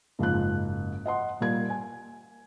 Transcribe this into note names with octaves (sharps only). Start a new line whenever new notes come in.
F#1 G#2 F3 F#6
D#5 F#5 C6
A#2 G3 A#3 G#6
G#5